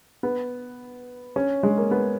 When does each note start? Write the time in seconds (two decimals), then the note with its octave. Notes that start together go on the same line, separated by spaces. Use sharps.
0.23 B3
1.36 C#4
1.63 G#3
1.77 A#3
1.91 B3